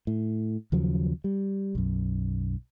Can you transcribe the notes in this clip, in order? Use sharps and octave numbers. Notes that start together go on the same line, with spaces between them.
A2
D#2 C#3 F3 F#3
G3
B1 F#2